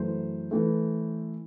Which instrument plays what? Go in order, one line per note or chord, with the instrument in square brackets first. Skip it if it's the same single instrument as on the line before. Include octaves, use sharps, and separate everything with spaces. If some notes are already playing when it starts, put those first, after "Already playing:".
Already playing: [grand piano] F#2 E3 A3 C5
E3 A3